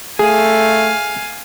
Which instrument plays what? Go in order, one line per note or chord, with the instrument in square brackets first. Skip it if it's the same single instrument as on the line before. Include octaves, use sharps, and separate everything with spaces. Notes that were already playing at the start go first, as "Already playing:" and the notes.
[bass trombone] A3 [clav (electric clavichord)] G#4 [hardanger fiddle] F5 G#5